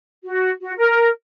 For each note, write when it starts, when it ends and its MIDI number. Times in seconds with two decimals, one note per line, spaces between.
0.24 0.50 66
0.61 0.71 66
0.77 1.08 70